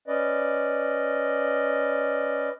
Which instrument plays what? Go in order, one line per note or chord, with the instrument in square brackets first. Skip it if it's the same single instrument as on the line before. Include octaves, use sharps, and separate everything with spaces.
[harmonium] C#4 B4 D5 D#5